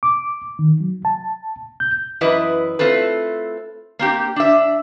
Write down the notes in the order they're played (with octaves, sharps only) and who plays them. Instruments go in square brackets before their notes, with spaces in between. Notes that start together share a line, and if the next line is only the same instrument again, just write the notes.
[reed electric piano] D6
D#3
F#3
A5
G6
[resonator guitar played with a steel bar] F#2 E3 E4 B4 D#5
A3 C4 F4 A4 B4
A#3 C4 G4
D4 E5